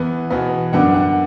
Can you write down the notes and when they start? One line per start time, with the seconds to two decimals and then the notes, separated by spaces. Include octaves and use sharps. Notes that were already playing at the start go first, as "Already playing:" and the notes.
Already playing: E2 E3 B3
0.30 E2 B2 B3
0.73 F#2 D3 B3 D4 F#5
0.94 F#5